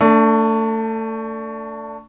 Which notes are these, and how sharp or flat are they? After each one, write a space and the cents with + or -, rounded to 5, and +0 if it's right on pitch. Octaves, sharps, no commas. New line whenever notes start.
A3 +25 D4 -10